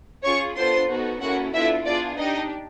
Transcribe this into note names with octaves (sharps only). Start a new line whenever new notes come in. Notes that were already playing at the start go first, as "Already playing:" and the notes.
C#4 F4 G#4 C#5 C#6
B3 D4 F4 A4 C5 C6
B3 D#4 F#4 A4
A#3 C#4 E4 F#4 A4 F#5
B3 D4 E4 F4 A4 E5
B3 D4 F4 G#4 D5
D4 D#4 G4 D#5